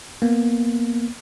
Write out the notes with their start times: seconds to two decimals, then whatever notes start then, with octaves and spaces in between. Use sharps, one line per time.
0.22 A#3 B3